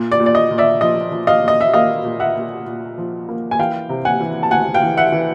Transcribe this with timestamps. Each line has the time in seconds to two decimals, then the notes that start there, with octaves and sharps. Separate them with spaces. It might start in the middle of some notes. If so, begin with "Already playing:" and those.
Already playing: A#2
0.12 D5
0.20 A#2
0.26 D5
0.35 D#5
0.51 A#2
0.58 D5 E5
0.81 F3 D#5
1.12 F3
1.27 D#5 F5
1.43 A#2 D#5
1.61 E5
1.74 A#3 D#5 F5
2.04 A#2
2.20 E5 F#5
2.36 A#2
2.66 A#2
2.98 F3
3.29 A#3
3.51 G#5
3.59 E3 F5 G5
3.89 C3
4.05 F#5 G#5
4.21 E3
4.43 A5
4.51 D2 F#5 G#5
4.74 F5 G5
4.82 E3
4.97 E5 F#5
5.12 E3